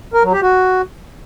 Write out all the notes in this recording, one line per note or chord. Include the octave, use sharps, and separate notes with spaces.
A#4
F#3
G4
F#4